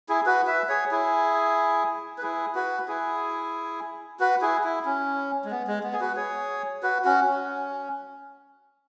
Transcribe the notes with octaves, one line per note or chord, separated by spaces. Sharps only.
E4 G#4
F#4 B4
B4 E5
G#4 C#5
E4 G#4
B4
E4 G#4
F#4 B4
E4 G#4
F#4 B4
E4 G#4
E4
C#4
G#3
B3
G#3
B3
G#4
F#4 B4
G#4 C#5
F#4 B4
C#4 F#4
C#4